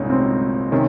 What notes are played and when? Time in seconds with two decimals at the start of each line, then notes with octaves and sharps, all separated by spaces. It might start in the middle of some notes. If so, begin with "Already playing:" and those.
Already playing: C2 A#2 G#3 C#4 D#4
0.10 C4
0.72 C3 D#3 C#4